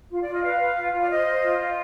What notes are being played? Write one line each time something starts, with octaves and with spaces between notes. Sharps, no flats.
F4
D5
F4
D#5
B4 F5
B4
F4
F4
D5
C5 D#5
C5
F4
F4